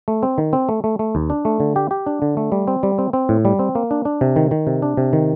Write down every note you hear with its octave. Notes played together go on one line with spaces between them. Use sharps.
A3
C4
D#3
C4
A3
A3
A3
D#2
D4
A3
D3
G4
G4
D4
D3
A3
G3
C4
G3
C4
C4
A2
G3
C4
A#3
D4
D4
C3
D#3
D#3
C3
D4
C3
D#3